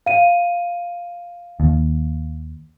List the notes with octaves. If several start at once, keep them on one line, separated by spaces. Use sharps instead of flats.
F5 D#7
D#2